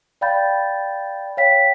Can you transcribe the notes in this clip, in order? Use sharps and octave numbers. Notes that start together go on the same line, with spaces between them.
D5 F5 G5 B5 G6 A6
C#5 F5 G5 B6